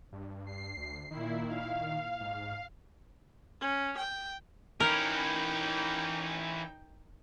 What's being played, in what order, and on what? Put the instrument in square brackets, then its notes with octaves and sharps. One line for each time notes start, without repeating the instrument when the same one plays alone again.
[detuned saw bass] G2
[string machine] C7
[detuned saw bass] D2
[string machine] A#2 E4 [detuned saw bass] D#3
[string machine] F5
[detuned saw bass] G#2
[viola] C#4
G5
[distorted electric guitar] E3 C#4 [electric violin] D#4 G5 [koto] A#4